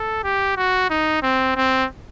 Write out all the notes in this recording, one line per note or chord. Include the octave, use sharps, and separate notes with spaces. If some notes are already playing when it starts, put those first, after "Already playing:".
Already playing: A4
G4
F#4
D#4
C4
C4